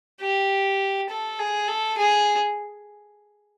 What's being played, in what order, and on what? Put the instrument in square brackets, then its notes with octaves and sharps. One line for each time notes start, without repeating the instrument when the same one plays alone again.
[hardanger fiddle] G4
A4
G#4
A4
G#4